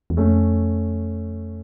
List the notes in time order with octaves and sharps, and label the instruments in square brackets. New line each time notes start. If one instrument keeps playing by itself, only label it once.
[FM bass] E2
[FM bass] F2 [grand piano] A3 C#4